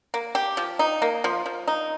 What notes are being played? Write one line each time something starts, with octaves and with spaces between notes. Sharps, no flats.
A#3
G4
F3
D#4
A#3
F3
F3
D#4